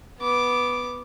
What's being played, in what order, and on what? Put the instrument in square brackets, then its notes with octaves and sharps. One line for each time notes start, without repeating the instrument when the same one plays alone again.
[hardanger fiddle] B3 D6